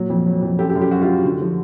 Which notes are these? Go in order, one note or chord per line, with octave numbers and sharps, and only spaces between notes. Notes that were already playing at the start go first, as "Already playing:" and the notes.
Already playing: A#2 F#3
F2
F#3
F2
F#2 G4 A4
G4 A4
F#2
G4
F#2 F#4
F4 G4
F#2
D3
F3